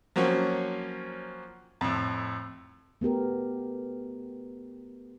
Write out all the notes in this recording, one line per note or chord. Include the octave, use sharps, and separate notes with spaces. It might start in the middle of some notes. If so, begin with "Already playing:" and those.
F3 F#3 A#3 C4 C#4
F2 A2
A3 B3 G4 A#4